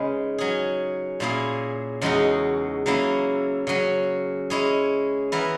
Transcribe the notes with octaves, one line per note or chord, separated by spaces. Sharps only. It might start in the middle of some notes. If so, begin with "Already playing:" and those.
Already playing: C#3 G#3 D#4 G#4 B4
F#3 C#4 G#4
A#2 A#3 C#4 E4 G#4
E2 C#3 G#3 D#4 F#4
C#3 F#3 A#3 C#4 E4
C#3 F#3 C#4
G#3 C#4 E4 G#4
E3 B3 E4 A#4